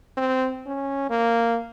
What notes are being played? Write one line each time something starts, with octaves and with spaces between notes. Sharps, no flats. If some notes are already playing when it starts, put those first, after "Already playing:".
C4
C#4
A#3